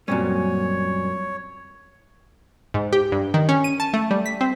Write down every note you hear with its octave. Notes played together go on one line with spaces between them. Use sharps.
F#2 A#2 G3 C4 C#4 C#5 D5
G#2
G4
G2
D#3
C#4
D#7
A5
A3
G3
B6
C4